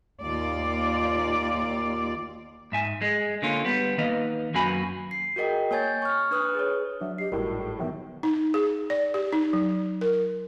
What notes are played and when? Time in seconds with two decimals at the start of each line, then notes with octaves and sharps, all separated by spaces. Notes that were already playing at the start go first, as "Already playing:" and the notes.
0.23 D#2 F4 D5
2.72 G#2 E5 G#5
3.02 G#3
3.42 D3 A#3 C#4 F4
3.65 G3 B3
3.98 D#3 A#3 B4 D#5 F5
4.54 F#2 A#3 C#4 F#4 G#5 B5
5.11 C7
5.36 F#4 G#4 A#4 D#5 G5
5.71 A#3 C#5 G#5 G6 A6
6.02 C#6 F6
6.31 D4 B4 D#6 F6 F#6
6.55 G#4 C#5
7.01 F#3 D4 E5
7.18 G4 D#5 C7
7.32 G#1 A2 G3 E4 F#4 A#4
7.60 G#4
7.79 B2 D#3 F#3 E5
8.23 D#4
8.54 G#4
8.90 D5
9.14 G4
9.33 D#4
9.53 F#3
10.01 A#4